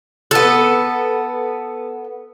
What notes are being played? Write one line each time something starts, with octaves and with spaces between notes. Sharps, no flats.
B3 A4